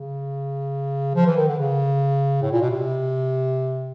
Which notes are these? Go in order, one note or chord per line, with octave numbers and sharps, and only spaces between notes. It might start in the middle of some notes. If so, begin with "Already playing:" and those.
Already playing: C#3
F3
E3
D#3
D3
C#3
A2
A#2
B2
C3